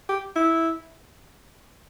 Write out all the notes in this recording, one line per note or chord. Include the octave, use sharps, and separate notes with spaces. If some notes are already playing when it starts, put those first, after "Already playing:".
G4
E4